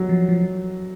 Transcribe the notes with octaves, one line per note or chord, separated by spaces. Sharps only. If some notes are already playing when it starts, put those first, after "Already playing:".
Already playing: F#3
F3
F3